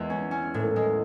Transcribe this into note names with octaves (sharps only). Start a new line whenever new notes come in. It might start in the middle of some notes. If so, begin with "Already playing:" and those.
Already playing: E2 G#3
C#4
C#4
A2
G#3